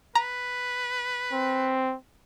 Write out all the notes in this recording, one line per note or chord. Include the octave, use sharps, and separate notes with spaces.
B4 A#5
C4